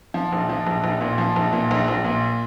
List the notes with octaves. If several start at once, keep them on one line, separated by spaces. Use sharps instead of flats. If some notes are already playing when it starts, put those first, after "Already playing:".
F3
A#1
F3
A#1
A#1
A#2
F3
A#1
A#2
A#1
A#1
A#2